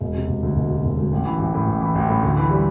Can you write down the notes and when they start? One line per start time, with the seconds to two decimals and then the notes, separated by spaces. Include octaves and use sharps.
0.01 E1
0.15 C3
0.28 E1
0.43 D2
0.56 E1
0.70 C3
0.85 E1
0.98 D2
1.12 A1
1.25 E3
1.39 A1
1.54 A2
1.67 A1
1.81 E3
1.95 A1
2.09 A2
2.22 D2
2.37 E3
2.51 G3